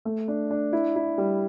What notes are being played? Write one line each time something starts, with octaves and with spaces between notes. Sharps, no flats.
A3
D4
D4
E4
E4
G3